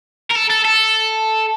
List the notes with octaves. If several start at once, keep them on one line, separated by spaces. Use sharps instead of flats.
A#4
A4
A4
A4